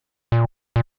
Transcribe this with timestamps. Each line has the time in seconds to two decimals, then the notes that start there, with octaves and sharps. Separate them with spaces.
0.32 A#2
0.76 A#2